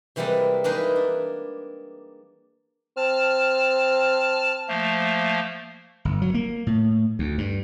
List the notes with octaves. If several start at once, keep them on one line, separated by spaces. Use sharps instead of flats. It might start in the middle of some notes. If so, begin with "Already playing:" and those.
C3 E3 G3 G#3 A#3 B4
E3 G#3 A#3 D#4 G#4 B4
D4
C4 A5 F6
F3 A3 A#3
G1
F#3
A#3
A2
D2
G2